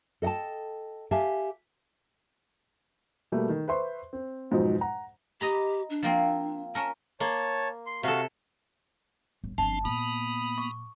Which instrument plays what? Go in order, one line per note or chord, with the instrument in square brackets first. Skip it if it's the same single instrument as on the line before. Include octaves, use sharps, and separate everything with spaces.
[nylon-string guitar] A4 D#5 F#5 G5 A5
G4 E5 F5 G#5 A5
[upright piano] B2 G3 A3 A#3
D#3
B4 C5 E5 C6 C#6
C4
F2 G#2 B2 F3 F#3 D#4
F#5 A#5
[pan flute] G4 [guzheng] D#5 A#5 B5
[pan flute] D4
[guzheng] F3 A#3 C4
[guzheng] C#4 A#4 [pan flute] A5
[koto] A#3 [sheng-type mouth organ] C#5 A5
[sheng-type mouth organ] C6
[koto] C3 A4 [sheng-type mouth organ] F#4 F5
[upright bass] G1
[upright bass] G1 D3 [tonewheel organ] F3 C4 D4 [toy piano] A5
[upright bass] A#2 [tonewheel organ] A#3 B3 [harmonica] B5 D#6
[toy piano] C#6 D6